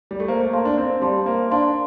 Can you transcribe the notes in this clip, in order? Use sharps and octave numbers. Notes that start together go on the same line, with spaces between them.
G3
A3
A#3 C5
A3
A#3 F5 A5 C6
D4
C4 C5
G3 F5 A5 C6
A#3 C5
D4 F5 A5 C6